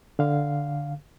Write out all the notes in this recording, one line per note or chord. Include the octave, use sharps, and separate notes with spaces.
D3 F5